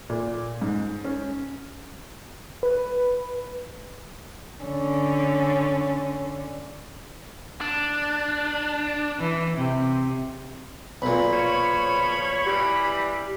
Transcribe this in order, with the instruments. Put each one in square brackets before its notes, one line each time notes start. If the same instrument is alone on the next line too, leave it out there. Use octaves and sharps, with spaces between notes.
[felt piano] A#2
G#2
C#4
[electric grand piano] B4
[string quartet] D3 C#4
[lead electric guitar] D4
[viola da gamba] E3
C3
[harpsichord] B1 A#2 [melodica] B5
[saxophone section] F3 C#5
[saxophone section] E3 G3 [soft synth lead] G4